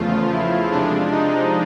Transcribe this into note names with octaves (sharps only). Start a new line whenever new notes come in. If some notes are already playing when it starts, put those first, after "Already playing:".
Already playing: E2 C#3 F3 A3 F4
E4
C3 F3 G#3 D4
D#4